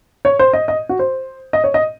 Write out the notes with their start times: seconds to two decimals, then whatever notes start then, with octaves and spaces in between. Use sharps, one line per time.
0.25 C#5
0.39 C5
0.53 D#5
0.68 D#5
0.89 F#4
0.99 C5
1.53 D#5
1.64 C#5
1.74 D#5